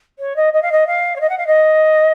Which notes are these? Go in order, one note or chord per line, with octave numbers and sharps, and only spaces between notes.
C#5
D#5
D#5
F5
D#5
F5
C#5
D#5
F#5
F5
D#5